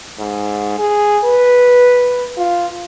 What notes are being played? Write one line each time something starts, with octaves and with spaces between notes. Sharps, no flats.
G#2
G#4
B4
F4